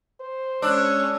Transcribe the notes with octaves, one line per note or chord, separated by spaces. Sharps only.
C5
G#3 C#4 D4 C#5 E6